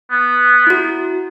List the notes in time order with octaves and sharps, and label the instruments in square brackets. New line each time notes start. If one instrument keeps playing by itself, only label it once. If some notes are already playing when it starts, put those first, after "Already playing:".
[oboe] B3
[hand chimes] E4 F#4